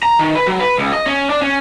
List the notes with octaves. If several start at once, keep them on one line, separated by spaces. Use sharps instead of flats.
A#5
D#3
B4
F#3
B4
C#2
D#5
C#4
D4
C#4